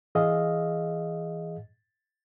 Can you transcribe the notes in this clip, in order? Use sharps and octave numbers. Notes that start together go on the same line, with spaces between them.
E3 G#4 D#5 F5